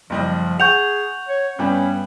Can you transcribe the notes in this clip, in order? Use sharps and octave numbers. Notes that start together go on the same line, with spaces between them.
F#1 F3 G3 D#5
G#4 F#5 C#6 G6 F7
C#5
G2 G3 B3 C#4